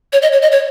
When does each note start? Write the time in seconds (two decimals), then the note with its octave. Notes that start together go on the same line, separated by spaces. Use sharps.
0.13 C#5
0.22 D#5
0.32 C#5
0.42 D#5
0.52 C#5